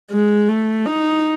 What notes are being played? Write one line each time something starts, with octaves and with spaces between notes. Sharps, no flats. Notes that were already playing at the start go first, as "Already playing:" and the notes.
G#3
A3
D#4